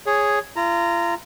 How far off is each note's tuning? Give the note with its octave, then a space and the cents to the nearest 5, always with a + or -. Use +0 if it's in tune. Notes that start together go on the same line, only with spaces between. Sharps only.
G#4 +0 C#5 +0
F4 -35 A#5 -10